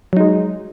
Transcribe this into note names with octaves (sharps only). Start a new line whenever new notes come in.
F#3 G#3 D#4